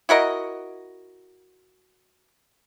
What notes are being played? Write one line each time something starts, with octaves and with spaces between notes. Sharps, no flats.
E4 F#4 A#4 D#5